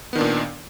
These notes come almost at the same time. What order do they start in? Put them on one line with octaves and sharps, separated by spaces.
B3 D#3 D4 A#2